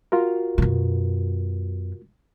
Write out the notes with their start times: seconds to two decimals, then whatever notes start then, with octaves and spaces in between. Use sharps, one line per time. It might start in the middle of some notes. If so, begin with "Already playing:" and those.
0.12 F4 F#4 A#4
0.58 F#2 B2